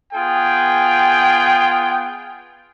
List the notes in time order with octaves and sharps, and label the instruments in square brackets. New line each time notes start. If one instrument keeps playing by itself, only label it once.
[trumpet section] B3 F4 G#4 G5